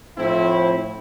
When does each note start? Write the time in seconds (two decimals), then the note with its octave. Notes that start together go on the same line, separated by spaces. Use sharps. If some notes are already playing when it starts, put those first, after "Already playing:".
0.17 A2 F3 C4 E4